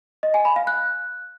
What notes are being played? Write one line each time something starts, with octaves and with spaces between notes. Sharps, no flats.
D#5
G#5
B5
F5
F#6